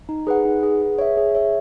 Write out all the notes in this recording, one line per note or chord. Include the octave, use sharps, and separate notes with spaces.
D#4
G#4 B4 F#5
D#4
G#4 B4 F#5
G#4
C#5 E5
G#4
C#5 E5